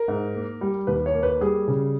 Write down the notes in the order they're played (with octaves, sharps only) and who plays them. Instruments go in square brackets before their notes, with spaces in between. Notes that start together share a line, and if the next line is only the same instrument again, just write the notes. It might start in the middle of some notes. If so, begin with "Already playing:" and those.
Already playing: [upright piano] A#4
G#2
A#3
G3
D#2 B4
C#5
A#3
B4
G3 G#4
C#3